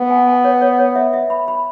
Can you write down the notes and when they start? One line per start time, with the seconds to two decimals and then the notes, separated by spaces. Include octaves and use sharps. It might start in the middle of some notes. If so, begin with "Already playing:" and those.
Already playing: B3
0.10 G#5
0.27 G#5
0.44 C#5
0.62 C#5
0.79 C#5
0.96 E5
1.13 E5
1.30 B5
1.48 B5